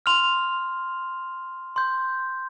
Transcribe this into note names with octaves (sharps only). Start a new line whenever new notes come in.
C6 F6 F7
C6 G6